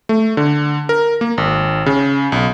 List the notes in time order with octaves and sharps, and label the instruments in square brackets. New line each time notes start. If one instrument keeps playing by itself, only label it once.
[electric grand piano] A3
D3
A#4
A#3
G#1
C#3
B1